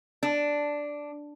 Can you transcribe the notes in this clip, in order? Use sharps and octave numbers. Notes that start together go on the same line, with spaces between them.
D4